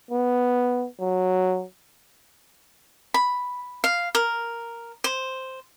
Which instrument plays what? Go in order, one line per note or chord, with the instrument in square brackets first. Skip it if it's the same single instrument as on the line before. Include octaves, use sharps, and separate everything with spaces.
[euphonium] B3
F#3
[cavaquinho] B5
F5
A#4
C5